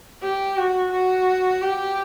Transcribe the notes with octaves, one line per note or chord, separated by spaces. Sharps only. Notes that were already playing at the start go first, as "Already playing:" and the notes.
G4
F#4
F#4
G4